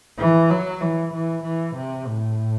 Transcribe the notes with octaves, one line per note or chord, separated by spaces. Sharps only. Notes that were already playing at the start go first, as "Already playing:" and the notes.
E3
F#3
E3
E3
E3
C3
A2